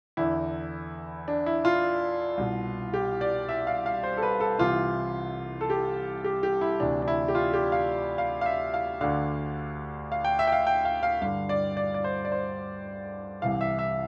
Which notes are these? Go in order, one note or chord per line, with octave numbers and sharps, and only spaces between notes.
E2 D3 E4
D4
E4
F4
C2 B2
G4
D5
E5
F5
F5
C5
A4
B4
A4
C2 C3 E3 F4
A4
G4
G4
G4
E4
D2 C3 E3 D4
D4
E4
G4
F4
G4
F5
F5
F5
E5
F5
D2 D3 F5
F5
G5
E5
G5
F5
G5
F5
F5
G2 D3 F5
D5
D5
D5
C5
D5
C5
C2 C3 E3 F5
E5
E5